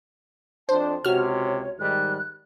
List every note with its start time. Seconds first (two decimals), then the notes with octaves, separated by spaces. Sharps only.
0.69 F2 D4 C5 A5
1.05 C#2 C3 F#4 C#5 F6
1.79 G#2 D#3 G3 F#6